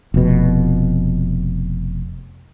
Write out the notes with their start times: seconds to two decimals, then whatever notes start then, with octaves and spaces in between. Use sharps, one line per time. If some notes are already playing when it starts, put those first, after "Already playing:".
0.14 F1 B2